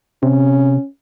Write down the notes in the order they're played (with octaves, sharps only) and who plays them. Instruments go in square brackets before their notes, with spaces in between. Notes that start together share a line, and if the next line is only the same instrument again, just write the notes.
[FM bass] C3 [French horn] C#4